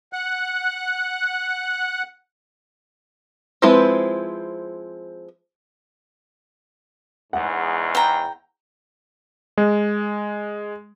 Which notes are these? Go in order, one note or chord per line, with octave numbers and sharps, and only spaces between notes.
F#5 F#6
F3 G#3 C4 E4 B4
E2 G#2 F#5
G5 A#5
G#3